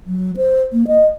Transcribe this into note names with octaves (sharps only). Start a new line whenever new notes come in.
F#3
C5
A#3
D#5